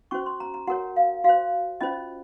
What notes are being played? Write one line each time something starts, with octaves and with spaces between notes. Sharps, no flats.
C#4 F#4 C5 C#6
C6
A#5
A#5
F#4 A#4 C#5 F#5
F5
F#4 C5 F5
C#4 F4 C5 D#5